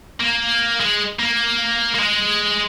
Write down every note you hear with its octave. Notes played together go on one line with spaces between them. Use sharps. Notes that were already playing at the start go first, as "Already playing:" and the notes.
A#3
G#3
A#3
A#3
G#3